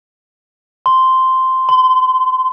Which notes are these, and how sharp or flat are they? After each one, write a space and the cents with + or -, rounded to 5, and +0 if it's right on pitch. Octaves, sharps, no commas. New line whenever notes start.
C6 -5
C6 -30